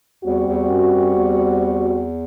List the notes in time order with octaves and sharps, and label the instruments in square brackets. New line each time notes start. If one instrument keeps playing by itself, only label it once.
[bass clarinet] E2 [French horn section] G3 C4 F#4
[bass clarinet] E2
F#2
F#2
E2